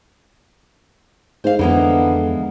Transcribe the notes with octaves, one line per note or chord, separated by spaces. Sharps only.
G#2 C5 F5
F2 D3 E3 G#3 A#3 B3